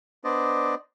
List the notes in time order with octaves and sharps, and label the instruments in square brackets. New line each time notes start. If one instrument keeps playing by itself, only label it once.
[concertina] B3 D4 C5 D5 D#5